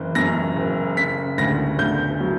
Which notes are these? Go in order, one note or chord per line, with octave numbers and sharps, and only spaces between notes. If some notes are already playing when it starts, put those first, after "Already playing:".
Already playing: F#1 E3
F#2 A#6
F#1
C#3 B6
D2 A#6
D2 G6
F#3